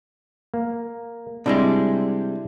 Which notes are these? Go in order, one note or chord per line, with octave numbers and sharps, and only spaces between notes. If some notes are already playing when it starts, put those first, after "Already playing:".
A#3
C3 G3 G#3 D4 E4 E5